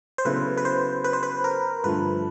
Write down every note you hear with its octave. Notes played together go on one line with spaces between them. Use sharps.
C5
C#3 F#3 B3 E4 A4 B4
B4
C5
B4
C5
B4
A#4
G2 D3 F3 A3 B4